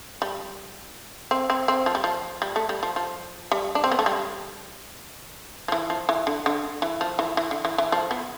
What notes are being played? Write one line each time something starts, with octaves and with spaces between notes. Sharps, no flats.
G3
C4
C4
C4
F3
G3
F3
G3
A3
G3
F3
F3
G3
D4
C4
B3
A3
G3
F3
E3
F3
E3
D3
D3
E3
F3
E3
E3
D3
E3
E3
F3
B3